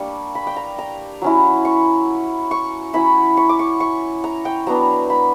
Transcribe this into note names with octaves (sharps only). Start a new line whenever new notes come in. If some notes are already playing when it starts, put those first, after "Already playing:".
Already playing: G3 A#3 D4 C#6
B5
G5
A#5
A#5
F#3 C#4 E4
C#6
C#6
F#3 C#4 E4 B5
C#6
D6
C#6
C#6
A#5
G5
F#3 B3 D4 A#5
B5